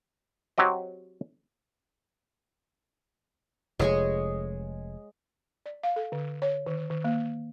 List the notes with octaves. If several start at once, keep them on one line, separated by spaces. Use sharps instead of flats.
F#3 C4 G4 D#5
F1 G#3 G#4 C#5 C#6
D5
F5
A4
D3
C#5
D#3
D#3
A#3